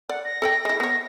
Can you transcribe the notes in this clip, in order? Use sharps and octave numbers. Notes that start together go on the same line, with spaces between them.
D5 F#5
A#6
A4 D5 G5
G#3 E4
B3 C#5